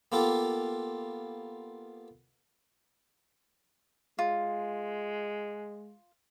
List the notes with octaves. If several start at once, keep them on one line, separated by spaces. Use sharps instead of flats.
A#3 B3 F4 G4 A4
G#3 F4